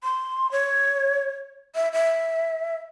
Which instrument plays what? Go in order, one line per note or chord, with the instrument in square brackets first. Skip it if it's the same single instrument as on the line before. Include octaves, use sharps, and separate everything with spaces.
[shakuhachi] C6
C#5
E5
E5